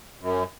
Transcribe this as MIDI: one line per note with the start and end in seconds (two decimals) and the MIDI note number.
0.21 0.43 42